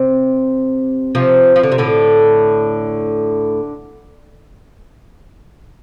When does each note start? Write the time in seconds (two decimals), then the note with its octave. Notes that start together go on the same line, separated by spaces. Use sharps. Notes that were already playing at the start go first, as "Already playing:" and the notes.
Already playing: C3
1.15 C3 F3
1.56 F3
1.63 D3
1.72 C3
1.78 A2 D3